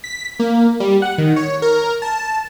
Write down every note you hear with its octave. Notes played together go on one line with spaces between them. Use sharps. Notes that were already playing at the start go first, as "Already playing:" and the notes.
B6
A#3
G3
F#5
D#3
C#5
A#4
A5